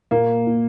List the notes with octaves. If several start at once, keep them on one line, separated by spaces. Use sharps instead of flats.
A#2 A#3
A#2